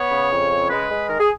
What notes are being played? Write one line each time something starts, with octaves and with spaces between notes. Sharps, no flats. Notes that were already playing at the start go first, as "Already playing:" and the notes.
Already playing: B3 C#5
C#3
F2
C#3
G#3 B4
G#3
D#3 A#4
G#4